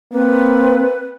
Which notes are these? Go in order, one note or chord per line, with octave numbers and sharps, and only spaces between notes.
A#3 C4 B4